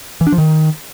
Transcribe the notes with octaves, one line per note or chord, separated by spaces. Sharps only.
E3
D4
F3
D#3